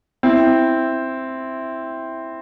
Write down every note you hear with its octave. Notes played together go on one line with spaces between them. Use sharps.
C4 E4